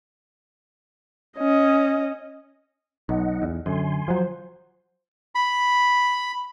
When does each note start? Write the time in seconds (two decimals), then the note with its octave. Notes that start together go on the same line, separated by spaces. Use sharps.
1.38 C#4 D#5
3.09 B1 D#4 D#5 F#5
3.42 E2
3.66 F#2 D3 G#5 C6
4.08 F3 F#3 C5
5.35 B5